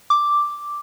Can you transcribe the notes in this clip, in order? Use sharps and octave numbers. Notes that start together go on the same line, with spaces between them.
D6